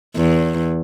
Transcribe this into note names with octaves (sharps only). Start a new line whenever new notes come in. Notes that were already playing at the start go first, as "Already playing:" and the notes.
E2